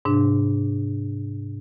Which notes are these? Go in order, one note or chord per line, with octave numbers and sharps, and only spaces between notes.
G#2 C3 D4